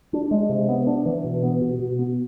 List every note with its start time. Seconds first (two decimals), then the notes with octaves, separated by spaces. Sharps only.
0.13 D4
0.31 G#3
0.49 C3
0.69 B3
0.87 D4
1.06 E3
1.24 B2
1.43 B3
1.61 B2
1.79 B2
1.99 B3